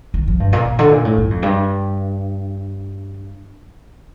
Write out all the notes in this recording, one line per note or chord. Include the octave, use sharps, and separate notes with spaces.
D#3
F3
G2
A#2
A#2
D3
A#2
A2
G2
F2
G2